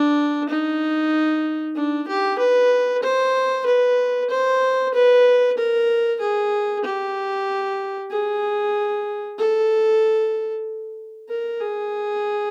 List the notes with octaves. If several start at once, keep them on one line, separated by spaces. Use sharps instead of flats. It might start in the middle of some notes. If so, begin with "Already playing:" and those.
Already playing: D4
D#4
D4
G4
B4
C5
B4
C5
B4
A#4
G#4
G4
G#4
A4
A#4
G#4